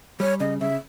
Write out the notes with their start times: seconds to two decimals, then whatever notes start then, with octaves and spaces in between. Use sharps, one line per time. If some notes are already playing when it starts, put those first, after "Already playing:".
0.20 G3 C#5
0.40 C#3 D#5
0.60 C#3 E5